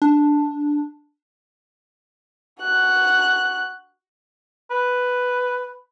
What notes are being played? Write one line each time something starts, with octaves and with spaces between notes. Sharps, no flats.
D4
F#4 F#6
B4